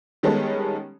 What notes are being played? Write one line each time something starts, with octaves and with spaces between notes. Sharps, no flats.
D#3 G3 G#3 B3 C#4 A4